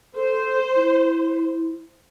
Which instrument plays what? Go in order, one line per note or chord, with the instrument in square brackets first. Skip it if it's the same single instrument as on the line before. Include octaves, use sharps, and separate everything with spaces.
[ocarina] A4 [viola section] C5
[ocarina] E4